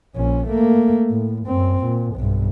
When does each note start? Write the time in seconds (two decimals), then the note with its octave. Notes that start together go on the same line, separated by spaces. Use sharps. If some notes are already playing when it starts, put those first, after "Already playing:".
0.16 A#1 C#4
0.48 A3 A#3
1.10 A2
1.47 F#2 C4
1.84 A#2
2.16 B1 G2